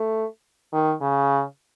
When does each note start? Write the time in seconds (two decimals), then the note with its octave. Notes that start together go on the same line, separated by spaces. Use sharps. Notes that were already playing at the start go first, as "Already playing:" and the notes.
Already playing: A3
0.73 D#3
1.01 C#3